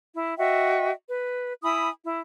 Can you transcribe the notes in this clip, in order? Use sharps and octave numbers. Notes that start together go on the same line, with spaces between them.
E4
F#4 D#5 E5 G5
B4
E4 G#5 B5 D#6
E4